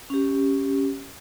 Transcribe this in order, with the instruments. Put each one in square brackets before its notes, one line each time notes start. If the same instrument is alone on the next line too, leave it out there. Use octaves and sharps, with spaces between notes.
[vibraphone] C#4 G4